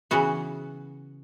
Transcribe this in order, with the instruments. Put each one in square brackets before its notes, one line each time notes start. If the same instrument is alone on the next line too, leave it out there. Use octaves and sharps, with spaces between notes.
[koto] C#3 E3 B3 F#4